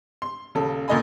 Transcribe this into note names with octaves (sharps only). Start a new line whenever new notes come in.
C6
D#1 C#3 A4
C#2 A#2 D3 D#5 G#5 B5